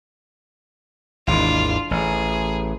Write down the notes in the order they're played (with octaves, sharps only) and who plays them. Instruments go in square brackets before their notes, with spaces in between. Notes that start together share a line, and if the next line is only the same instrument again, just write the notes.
[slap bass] G#1 D#2 E3 [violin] D4 F4
[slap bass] A1 [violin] G#4